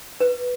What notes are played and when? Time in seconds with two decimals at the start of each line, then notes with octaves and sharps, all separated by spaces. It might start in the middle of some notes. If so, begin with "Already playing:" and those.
0.20 B4